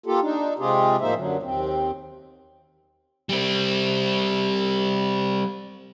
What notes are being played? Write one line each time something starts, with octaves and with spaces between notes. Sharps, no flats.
A#3 F4 G4 A4
D4 D#4
C3 G#3 C4 F4 G4 G#4
A2 F3 A#3 D#4 C5 E5
F#2 D3 F#3
D#2 C4
G3 C4